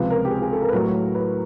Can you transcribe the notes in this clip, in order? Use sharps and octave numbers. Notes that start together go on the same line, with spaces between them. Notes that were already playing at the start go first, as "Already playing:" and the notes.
Already playing: C#2 C3 F3 B4
A#4
G4
G#4
G#4
A4
A#4
B4
A2 F#3 A#4
B4